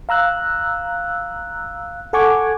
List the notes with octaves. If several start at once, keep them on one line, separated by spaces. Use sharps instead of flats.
F5 A#5 E6 F#6
A4 F#5 G#5 C#6 D6 G#6